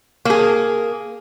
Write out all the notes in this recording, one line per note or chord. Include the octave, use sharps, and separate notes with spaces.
A#3 G#4